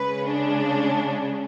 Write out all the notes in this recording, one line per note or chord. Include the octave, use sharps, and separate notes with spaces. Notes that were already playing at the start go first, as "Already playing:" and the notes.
Already playing: C#3 G#3 C#4 B4
D4